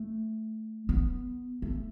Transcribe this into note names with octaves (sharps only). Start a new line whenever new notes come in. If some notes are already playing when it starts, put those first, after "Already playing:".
Already playing: A3
B3
A3